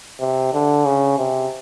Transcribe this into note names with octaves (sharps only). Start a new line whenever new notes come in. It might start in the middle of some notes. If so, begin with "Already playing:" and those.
C3
D3
C#3
C3